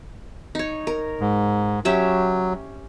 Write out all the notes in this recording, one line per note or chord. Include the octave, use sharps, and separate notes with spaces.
D#4 C#5
A#4
G#2
F#3 C#4 G4 E5